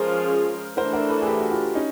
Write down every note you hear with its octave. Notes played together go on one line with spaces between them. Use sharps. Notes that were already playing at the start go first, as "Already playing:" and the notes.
Already playing: F3 G#3 C#4 F4 G#4 A#4 C5
E3 A3 D4 A#4 C5
A#4 C5
A4 B4
G#4
G4 A4
F#4
F4 G4
C#4 D#4